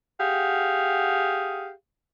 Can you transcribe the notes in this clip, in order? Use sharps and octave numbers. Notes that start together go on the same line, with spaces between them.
G4 G#4 F5 F#5